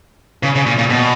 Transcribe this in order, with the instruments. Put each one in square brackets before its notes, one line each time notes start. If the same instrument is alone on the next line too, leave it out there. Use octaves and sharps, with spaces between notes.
[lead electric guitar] C#3
C#3
A#2
A#2
B2